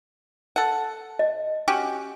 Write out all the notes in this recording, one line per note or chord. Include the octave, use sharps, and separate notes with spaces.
A4 F#5
D#5
C#4 F#4 G4